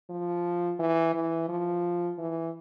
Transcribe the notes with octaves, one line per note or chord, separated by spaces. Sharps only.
F3
E3
E3
F3
E3